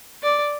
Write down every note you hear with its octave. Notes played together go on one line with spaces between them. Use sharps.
D5